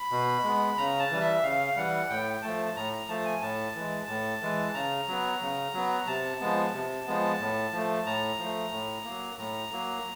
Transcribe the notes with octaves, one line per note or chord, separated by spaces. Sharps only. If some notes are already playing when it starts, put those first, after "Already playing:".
Already playing: B5
B2
G#3 B3
C#3 A#5
A5
E3 G3
E5
C#3 F5
E3 G3 F#5
A2 G5
F3 A3 A5
A5
A2 A#5
A#5
F3 A3 A5
G#5
A2 A5
E3 G#3
A2
E3 G#3
C#3 A#5
F#3 B3
C#3
F#3 B3
C3 A5
F3 G#3 B3
C3
F3 G#3 B3
A2
F3 A3
A2 A#5
F3 A3
A2
F#3 A#3
A2 A#5
F#3 A#3